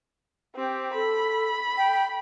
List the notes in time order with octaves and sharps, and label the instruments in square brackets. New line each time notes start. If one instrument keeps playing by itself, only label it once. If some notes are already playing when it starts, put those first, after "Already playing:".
[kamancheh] C4 G4
[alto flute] A4 [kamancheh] B5
[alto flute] G5